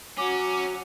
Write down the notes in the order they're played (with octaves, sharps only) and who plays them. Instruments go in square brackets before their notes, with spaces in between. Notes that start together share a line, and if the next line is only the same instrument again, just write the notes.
[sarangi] F#3 [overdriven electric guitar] C#4 [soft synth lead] D6